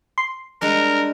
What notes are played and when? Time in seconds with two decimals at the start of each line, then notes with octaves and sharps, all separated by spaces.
0.18 C6
0.61 G3 G#3 D4 A#4